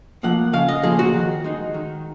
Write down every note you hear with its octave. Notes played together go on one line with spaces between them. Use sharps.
F3 A#3 F#5
C#3 F5
D#5
F3 A#3 G#4
F#4
D#3
G#3 D#4
D#3